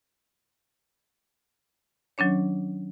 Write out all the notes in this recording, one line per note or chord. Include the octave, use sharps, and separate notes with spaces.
D#3 F#3 C#4 D4 C#5